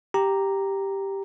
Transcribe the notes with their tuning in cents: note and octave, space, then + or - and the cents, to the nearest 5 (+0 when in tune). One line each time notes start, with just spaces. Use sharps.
G4 +0 A#5 +0